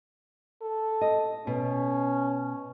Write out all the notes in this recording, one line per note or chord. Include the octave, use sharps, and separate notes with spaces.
A4
D#5
B2 C#4